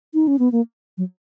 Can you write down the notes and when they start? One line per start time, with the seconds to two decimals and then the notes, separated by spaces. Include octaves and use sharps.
0.14 D#4
0.27 C#4
0.39 B3
0.52 A#3
0.97 F#3